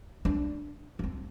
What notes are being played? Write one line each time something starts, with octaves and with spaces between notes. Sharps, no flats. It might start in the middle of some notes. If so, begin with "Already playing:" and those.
D4
D4
C4